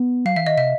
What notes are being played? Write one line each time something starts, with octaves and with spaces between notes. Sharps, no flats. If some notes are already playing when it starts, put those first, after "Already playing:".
Already playing: B3
F#3 F5
E3 E5
D#3 D#5
C3 E5